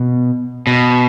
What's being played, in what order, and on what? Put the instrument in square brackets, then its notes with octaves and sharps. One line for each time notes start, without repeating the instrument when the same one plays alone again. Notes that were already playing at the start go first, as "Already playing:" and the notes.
Already playing: [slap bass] B2
[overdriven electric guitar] B2